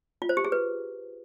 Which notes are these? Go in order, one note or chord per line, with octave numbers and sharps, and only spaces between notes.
F4
C5
G4
G#4
B4